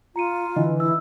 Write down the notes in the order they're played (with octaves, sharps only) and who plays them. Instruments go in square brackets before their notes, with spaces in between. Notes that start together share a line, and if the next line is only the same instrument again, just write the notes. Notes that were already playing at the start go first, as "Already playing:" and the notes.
[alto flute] F4 [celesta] A#5 C#7 D#7
[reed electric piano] D3 [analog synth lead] E3 [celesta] D#5
[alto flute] E4 [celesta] E6